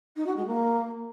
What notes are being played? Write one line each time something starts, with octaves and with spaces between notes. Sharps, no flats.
D#4
F#4
G#3
A#3